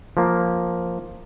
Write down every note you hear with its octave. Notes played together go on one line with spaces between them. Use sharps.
F3 A#3